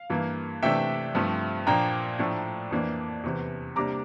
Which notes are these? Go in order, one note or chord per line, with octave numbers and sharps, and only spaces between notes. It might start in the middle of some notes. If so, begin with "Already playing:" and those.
Already playing: F5
G2 E3 A#3
C3 E3 A3 D4 E5 G5
G2 F3 A3 C4
A#2 F3 A#3 D4 G5 A#5
A2 F3 A3 D4
F2 E3 A#3 D4
E2 C3 E3
C3 G3 A#3 D4 A#5 D6